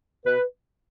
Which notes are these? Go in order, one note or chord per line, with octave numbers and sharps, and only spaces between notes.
B2 B4